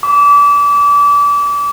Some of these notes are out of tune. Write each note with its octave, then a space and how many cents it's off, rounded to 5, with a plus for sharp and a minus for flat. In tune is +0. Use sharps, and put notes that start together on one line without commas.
D6 -30